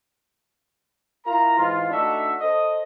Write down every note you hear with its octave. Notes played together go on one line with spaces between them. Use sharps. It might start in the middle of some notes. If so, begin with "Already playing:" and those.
E4 F4 A#4 A#5
G#2 E3 F4
A3 D4 D#4 F#4 E5
A4 C5 D#5